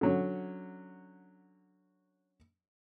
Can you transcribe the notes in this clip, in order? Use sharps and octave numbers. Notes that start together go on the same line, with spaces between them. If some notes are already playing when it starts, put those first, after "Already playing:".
D3 F#3 C#4